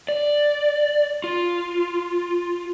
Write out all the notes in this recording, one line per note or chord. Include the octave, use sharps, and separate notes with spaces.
D5
F4